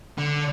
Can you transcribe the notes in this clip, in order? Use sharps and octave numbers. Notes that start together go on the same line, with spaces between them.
D3